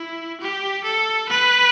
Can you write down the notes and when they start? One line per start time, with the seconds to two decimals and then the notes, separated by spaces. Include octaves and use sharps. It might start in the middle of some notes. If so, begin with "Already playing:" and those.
Already playing: E4
0.41 G4
0.84 A4
1.28 B4